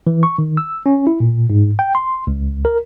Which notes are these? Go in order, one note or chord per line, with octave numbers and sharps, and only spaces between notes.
E3
C#6
D#3
E6
C#4
E4
A#2
G#2
G5
C6
C#2
A#4